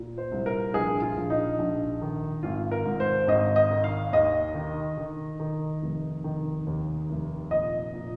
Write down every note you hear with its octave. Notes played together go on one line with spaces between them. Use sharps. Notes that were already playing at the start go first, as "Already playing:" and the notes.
Already playing: A#2
C5
C2
A#4
A#1 G#4
F4
A#1
D#4
A#1
D#3
G#1 F4
A#4
G#2
C5
G#1 D#5
D#5
D#3
F5
D#2 D#5
D#3
D#3
D#3
F1
D#3
D#2
F1
A#2 D#5
A#2